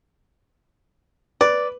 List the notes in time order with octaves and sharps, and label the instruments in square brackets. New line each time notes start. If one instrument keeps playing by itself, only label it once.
[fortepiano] B4 [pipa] D5